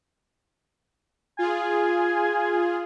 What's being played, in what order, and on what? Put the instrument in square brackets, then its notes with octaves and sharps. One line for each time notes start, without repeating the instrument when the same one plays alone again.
[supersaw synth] F4 G#4 [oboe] G#5